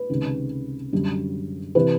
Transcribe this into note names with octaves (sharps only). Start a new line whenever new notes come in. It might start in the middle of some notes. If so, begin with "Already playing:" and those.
Already playing: B4
C#2 C3 D#3
F#2 D3 G3
C3 E3 B4